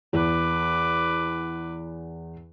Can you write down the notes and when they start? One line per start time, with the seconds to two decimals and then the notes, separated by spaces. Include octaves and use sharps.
0.13 E2 B4 D6